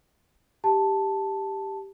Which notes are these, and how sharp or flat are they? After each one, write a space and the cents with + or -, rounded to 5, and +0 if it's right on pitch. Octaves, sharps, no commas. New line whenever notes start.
G4 +0 A5 +0